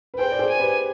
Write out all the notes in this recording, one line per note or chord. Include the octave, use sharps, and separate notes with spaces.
B4
G#4 C5 G5
D5
G#4 C5
G#5
G4 B4